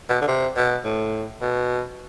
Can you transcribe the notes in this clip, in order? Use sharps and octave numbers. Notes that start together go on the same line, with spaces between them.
B2
D3
C3
B2
A2
B2